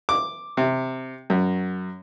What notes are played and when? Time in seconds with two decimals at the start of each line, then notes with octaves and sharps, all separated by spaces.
0.09 D6
0.57 C3
1.30 F#2